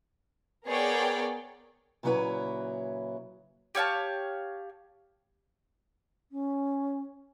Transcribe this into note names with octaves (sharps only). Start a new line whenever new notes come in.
B3 G#4 A#4 C#5 D5 G5
A#2 C#3 F#3 E4 B4 C#5
G4 C#5 F5 A5
C#4